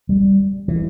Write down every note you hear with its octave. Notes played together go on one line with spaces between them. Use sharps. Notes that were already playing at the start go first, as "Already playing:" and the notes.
G3
E3